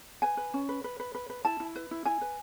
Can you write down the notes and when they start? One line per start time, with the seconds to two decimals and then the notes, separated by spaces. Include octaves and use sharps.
0.22 B4 G#5
0.37 B4
0.54 C#4
0.69 B4
0.84 B4
1.00 B4
1.15 B4
1.30 B4
1.45 E4 A5
1.60 E4
1.76 B4
1.91 E4
2.05 E4 G#5
2.21 B4